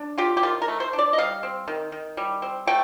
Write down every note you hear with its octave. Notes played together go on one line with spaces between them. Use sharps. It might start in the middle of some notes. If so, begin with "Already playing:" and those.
Already playing: D4
F4 G4
G4
D#3 F4
A#4
A3
C5
D4
D5
D#5
G3 F5
C4
D#3
D#3
G3
C4
A3 G5